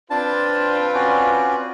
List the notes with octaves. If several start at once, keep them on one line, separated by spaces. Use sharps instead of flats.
C4 D4 F4 B4 A5
C#4 F#4 D5